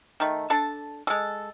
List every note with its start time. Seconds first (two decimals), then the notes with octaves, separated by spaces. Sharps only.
0.20 D#3 A3
0.50 D4 A4 A5
1.07 G#3 A4